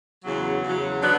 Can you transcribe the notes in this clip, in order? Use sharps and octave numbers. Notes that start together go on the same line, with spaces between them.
E2 C#3 F#3
E2 C#3 F#3
D3 F#3 B3 D4